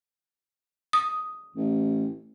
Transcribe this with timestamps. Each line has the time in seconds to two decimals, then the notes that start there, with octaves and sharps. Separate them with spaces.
0.93 D#6
1.56 A1